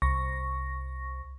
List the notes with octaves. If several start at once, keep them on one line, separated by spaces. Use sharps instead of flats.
C2 C#6 A#6